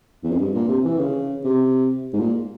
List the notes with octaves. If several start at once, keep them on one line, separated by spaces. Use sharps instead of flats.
E2
F2
G2
A#2
C3
E3
C#3
C3
G#2
A#2